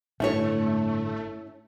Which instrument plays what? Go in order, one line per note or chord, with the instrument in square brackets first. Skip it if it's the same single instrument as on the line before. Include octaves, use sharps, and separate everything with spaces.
[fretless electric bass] G1 A2 D4 [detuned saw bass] A3 [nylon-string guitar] C#4 E4 C#5